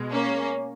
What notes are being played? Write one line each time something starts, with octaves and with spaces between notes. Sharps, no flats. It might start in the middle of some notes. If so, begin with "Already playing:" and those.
Already playing: B2 G#3
A#3 C#4